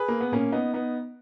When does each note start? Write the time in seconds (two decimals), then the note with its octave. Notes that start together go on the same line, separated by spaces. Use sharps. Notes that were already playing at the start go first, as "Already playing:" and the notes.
Already playing: G#4 B4
0.08 A#3
0.21 B3
0.32 A#2 A#3 C#4
0.52 B3 D#4
0.74 B3 D#4